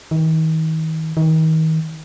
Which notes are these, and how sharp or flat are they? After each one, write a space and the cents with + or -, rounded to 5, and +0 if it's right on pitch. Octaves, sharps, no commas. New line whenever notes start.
D#3 +40
D#3 +35